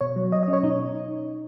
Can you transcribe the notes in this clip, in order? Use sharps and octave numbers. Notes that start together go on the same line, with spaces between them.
B2 C#5
F#3
F#3 D#5
D#5
C#4
C#5
B2 D#4